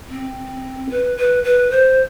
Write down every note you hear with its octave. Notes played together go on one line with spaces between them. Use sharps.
C4
B4
B4
B4
C5